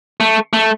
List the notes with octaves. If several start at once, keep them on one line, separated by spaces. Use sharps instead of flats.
A3
A3